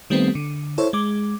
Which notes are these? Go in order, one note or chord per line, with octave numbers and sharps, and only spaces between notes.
D#3 G3 A3 B3 C4
D3
E4 A4 C5 C#5
G#3 D6